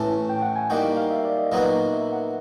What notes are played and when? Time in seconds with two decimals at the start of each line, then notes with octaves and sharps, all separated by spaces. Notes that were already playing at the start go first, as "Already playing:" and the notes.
Already playing: A2 E3 A3 C#4 A5
0.29 G5
0.42 F#5
0.56 G#5
0.70 G3 A#3 D#4 F#4 G5
0.84 F5
0.97 F5
1.11 E5
1.25 D5
1.38 D#5
1.52 A#2 F#3 B3 D#4 F#4
1.93 E5
2.12 F#5